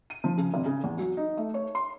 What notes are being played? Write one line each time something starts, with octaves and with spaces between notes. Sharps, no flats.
D#7
F3
C#3
G#1
C#3
E2
F#3
D#4
A3
C#5
C6